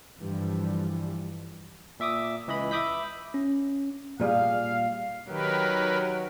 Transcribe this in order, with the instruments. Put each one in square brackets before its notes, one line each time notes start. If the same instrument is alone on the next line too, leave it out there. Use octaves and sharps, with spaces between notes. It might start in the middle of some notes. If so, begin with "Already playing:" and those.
[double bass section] G2 D3 E3 F3 G3
[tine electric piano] A#2 E5 D6 D#6
C#2 E3 D#5 B5
E5 B5 D6 D#6 G6 B6
C#4
[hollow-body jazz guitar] A#2 G3 G#4 [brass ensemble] F5
[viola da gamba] D#3 G4 [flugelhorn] F#3 [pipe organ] A#4 B4